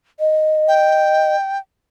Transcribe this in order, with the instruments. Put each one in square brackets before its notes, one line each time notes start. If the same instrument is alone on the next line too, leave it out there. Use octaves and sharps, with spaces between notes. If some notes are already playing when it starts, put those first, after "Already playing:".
[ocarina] D#5
[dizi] G5